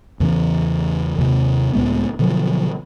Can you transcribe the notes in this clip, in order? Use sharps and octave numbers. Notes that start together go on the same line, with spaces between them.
E2 C#3 E3 C#4
D#2 C3
C#2 A2 G#3 B3
B2 D3 F3 F#3